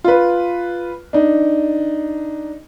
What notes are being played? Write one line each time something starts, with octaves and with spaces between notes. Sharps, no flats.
F4 B4
D4 D#4